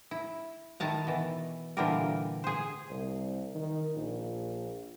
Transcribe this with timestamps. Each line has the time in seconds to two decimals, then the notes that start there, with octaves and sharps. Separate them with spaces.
0.11 E4
0.80 D#3 E4 A5 A#5
1.07 B2 E3
1.77 A#2 D3 E3 G3 A#3 A#4
2.44 G#4 C5
2.90 C2
3.55 D#3
3.96 A#1